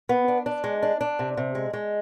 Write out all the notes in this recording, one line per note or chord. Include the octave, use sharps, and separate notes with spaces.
B3
D4
D4
G#3
D4
D4
C3
C3
G#3
G#3